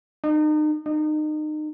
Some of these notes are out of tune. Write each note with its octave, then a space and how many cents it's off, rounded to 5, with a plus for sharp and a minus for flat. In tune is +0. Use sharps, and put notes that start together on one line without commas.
D#4 -35
D#4 -30